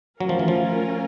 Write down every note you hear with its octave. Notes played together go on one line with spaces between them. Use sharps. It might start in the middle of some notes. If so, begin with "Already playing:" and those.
F#3 A3 C#4 F4 A#4
F3
E3
F3